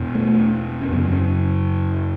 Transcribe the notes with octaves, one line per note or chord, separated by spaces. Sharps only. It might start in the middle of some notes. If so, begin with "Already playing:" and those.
Already playing: E2 B2
A3
C#4
F#2 C#3 B3
C#4